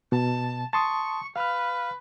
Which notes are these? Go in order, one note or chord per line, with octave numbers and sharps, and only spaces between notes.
B2 A5
A5 C6 C#6 D#6
B4 F5 F6